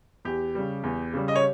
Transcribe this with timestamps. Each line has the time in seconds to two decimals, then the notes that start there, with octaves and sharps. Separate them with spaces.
0.25 E2 G4
0.55 C#3 G3
0.84 E2
1.13 C#3 G3
1.28 D#5
1.36 C#5